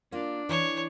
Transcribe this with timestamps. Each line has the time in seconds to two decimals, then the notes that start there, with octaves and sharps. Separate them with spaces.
0.12 A#3 D4 F4
0.49 E3 C#5